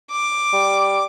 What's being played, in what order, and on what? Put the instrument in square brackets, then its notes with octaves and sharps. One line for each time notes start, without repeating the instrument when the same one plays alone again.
[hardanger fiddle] D6
[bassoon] G3